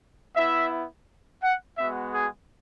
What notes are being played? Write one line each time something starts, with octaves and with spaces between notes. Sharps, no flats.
B3 E4 E5
F#5
G#3 B3 F#4 E5
G#4